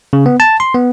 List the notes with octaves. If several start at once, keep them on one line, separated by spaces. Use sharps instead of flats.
C#3
B3
A5
C6
B3